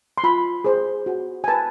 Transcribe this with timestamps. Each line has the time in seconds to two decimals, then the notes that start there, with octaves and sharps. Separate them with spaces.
0.18 C6
0.24 F4 B5
0.64 G#4 C5
1.06 F#4
1.44 G#5
1.48 B4 A5